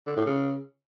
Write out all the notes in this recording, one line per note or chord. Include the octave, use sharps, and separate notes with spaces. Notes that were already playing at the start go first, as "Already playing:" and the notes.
D3
A2
C#3